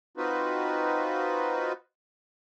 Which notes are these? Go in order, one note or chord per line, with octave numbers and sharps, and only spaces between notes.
C4 D#4 F4 F#4 B4